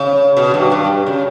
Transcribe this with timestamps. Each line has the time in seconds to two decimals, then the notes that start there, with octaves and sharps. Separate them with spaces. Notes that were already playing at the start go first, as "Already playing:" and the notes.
Already playing: C#3
0.37 B2
0.54 G2
0.71 G2
1.06 C#3